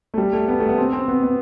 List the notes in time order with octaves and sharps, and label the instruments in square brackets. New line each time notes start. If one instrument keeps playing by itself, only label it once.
[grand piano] A3
G3
A3
B3
A3
B3
C4
C4
B3
B3